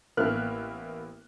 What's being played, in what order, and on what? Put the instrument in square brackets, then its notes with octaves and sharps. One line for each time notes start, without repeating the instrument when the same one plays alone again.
[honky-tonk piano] A1 A#3 B3 E5 F6 F#6